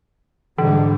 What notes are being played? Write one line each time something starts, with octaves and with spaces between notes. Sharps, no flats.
G#2 D3 E3 G3